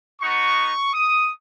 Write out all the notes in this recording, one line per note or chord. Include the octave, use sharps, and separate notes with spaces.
B3 D#4 F#4 C#6
D#6